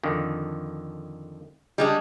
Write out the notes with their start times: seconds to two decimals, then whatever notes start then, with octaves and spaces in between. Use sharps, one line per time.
0.03 F2 D3 D#3
1.78 G3 G#3 D4